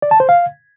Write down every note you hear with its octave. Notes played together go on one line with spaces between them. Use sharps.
D5
A5
C5
F5